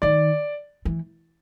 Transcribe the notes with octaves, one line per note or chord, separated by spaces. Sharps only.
D#3 D5
E3